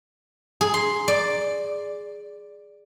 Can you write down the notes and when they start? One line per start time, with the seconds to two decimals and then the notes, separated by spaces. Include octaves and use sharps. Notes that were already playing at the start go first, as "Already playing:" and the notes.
0.61 G#4
0.74 C6
1.08 D5